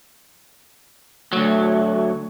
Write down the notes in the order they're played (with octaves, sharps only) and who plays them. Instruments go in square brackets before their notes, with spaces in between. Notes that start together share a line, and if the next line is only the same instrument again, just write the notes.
[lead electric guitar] D2 F#3 [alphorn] A3